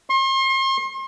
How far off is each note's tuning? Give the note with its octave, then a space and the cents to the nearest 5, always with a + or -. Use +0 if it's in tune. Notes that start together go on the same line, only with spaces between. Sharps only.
C6 +40